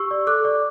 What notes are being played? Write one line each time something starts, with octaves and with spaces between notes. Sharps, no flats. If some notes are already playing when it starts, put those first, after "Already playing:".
Already playing: G4 C#6 E6
D5
A4 D6 F#6
D5